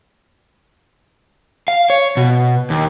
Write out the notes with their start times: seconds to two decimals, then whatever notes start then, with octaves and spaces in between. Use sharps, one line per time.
1.68 F5
1.90 C#5
2.17 B2
2.70 D#2